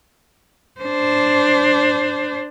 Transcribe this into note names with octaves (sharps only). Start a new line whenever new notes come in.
D4 C5